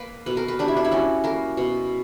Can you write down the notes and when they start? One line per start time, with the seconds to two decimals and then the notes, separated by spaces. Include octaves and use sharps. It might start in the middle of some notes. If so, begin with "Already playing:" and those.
Already playing: A#3 B4
0.26 B2 B4
0.37 A#4
0.48 B4
0.59 G3 D4
0.68 E4
0.77 D4
0.84 E4
0.92 C#4 F#4
1.24 A#3 A#4
1.57 B2